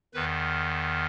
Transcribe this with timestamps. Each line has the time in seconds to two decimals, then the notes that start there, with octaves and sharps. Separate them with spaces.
0.14 E2 D#3 B4